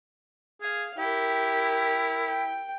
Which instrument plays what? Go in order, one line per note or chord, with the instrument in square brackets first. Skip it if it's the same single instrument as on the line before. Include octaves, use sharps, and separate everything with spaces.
[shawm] G#4 [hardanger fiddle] F5
[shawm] E4 [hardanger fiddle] G4 A#4
[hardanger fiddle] G5